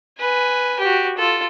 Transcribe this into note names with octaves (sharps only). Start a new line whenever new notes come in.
B4 G#5
F#4 G4
F4 A4